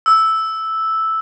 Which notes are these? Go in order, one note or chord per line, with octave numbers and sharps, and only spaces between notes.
E6